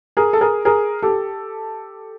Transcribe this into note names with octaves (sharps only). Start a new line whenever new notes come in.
G#4 A#4
A4
G#4 A#4
G#4 A#4
G4 A4